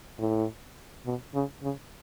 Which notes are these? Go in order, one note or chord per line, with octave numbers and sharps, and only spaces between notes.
A2
B2
C#3
C#3